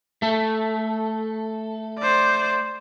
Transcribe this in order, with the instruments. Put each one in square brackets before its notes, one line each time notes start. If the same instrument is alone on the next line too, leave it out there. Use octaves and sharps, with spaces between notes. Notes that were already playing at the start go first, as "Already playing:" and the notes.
[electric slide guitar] A3 A4
[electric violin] C5 D5